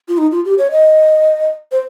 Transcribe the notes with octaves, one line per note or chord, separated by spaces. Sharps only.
F4
D#4
F4
G4
C#5
D#5
C5